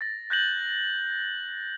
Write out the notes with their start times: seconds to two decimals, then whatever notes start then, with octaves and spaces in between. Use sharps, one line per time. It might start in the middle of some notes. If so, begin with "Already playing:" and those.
0.01 A6 A#6
0.30 F#6 G6 A#6 F#7